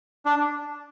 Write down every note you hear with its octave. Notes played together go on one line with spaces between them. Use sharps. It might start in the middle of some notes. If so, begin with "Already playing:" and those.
D4